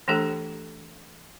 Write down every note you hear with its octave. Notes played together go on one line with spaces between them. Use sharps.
E3 A3 D4 G4 A4